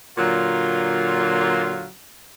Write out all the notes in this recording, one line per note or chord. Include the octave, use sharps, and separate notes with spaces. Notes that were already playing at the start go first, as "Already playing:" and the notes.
A#2 D3 F#3 F4